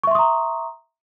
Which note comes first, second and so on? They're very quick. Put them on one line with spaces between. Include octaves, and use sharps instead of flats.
C#6 E5 C6 D#6 A#5